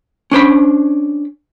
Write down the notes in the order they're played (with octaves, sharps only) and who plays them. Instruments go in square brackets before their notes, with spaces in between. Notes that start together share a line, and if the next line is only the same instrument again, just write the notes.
[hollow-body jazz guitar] C#4 D4 C5 B5